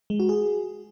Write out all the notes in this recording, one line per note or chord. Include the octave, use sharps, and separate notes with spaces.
G#3
F#4
G#4